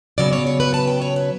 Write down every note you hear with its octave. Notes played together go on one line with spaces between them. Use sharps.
C#3 F#3 B3 D5
C#5
C#5
B4
A5
G5
C#5
B4